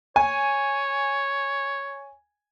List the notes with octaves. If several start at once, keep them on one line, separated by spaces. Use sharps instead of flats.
C#5 G#5